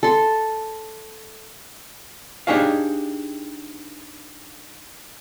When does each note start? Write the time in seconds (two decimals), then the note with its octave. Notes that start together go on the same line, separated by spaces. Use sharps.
0.03 A4 C6
2.47 D4 D#4 G4 G#4 C#5 F5